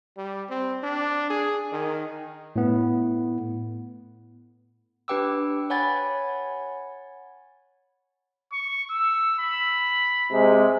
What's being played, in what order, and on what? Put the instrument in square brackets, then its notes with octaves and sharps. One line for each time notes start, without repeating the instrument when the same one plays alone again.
[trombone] G3
C4
D4
G#4
D#3
[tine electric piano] A2 B3
[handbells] D4 G4 B4 G5 D6 E6
C#5 F#5 G#5 B5 G#6 A6
[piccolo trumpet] C#6
E6
B5
[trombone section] C3 G#3